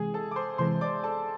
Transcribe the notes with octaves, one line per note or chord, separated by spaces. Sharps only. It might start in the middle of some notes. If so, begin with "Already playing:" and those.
Already playing: C3 E3 G#3 G#4 G#5
A4 A5
D6
C5 C6
C3 E3 G#3 C5 C6
D5 D6
A4 A5